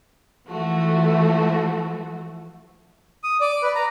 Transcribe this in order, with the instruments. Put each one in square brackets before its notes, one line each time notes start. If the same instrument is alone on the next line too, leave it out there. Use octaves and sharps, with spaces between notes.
[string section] E3 F3 A3 F#4
[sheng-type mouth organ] D#6
D5
B4
A#5